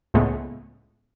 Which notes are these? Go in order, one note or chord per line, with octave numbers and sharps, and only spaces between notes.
C#2 A2 C#3 G#3 A3 B3